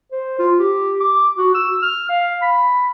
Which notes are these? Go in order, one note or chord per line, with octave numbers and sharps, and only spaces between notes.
C5
F4
G4
D6
F#4
E6
F6
F5
B5